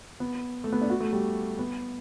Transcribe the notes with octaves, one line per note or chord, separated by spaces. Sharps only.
B3
A3
B3
D4
F#4
A3
G3
B3